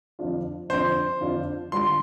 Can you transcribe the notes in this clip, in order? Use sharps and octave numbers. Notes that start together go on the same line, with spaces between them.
F2 D3 F3 D4 F4
F2 D3 F3 D4 F4 C5
F2 D3 F3 D4 F4
D3 G3 F4 C6